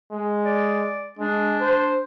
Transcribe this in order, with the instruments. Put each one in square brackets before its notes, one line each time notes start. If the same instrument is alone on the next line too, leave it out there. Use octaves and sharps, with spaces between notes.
[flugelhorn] G#3
[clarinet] D5
[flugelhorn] G#3 [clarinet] D4
[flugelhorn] C5